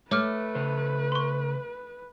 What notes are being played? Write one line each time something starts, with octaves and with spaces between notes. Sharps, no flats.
A3 B4 C#5 D6 F6
C#3 C5
C6 C#6